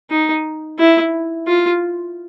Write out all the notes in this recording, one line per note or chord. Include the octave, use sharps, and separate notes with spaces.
D#4
E4
F4